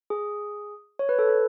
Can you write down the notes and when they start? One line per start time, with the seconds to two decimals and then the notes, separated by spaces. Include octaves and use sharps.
0.10 G#4
0.99 C#5
1.09 B4
1.19 A4
1.29 A4